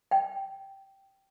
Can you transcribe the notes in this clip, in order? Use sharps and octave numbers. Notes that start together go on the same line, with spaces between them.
G5